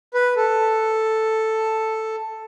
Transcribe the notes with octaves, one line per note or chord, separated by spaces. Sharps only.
B4
A4